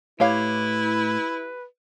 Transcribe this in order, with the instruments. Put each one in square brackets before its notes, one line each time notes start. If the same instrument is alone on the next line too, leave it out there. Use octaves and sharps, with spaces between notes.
[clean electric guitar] A2 [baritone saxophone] E4 [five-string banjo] G4 C#5 F5 [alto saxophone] B4